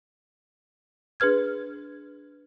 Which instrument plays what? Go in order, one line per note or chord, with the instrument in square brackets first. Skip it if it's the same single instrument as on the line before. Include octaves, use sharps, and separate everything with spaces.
[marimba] D4 G#4 B4 F6 G#6